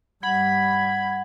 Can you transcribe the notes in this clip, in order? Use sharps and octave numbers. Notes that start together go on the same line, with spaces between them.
G2 G3 F#5 B5 G#6